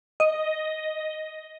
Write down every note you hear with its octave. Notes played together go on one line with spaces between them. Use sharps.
D#5